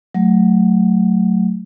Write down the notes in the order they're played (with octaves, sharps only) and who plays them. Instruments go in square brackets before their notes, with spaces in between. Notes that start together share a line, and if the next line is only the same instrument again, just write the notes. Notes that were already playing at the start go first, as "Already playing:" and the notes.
[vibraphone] F#3 A3